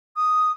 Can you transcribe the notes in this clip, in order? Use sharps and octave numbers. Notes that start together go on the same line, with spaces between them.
D#6